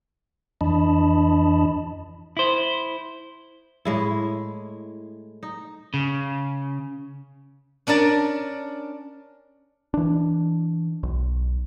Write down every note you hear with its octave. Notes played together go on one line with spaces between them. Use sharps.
F2 E3 D4 D#5 A5 B5
E4 C5
A2 G#3 E4
D#4
C#3
C#4 D4 A#4 D5 A5
E3 D4
B1